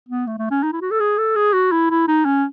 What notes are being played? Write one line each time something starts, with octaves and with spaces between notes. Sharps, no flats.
B3
A3
A3
C#4
D#4
E4
F#4
A4
G#4
A4
G#4
F#4
E4
E4
D#4
C#4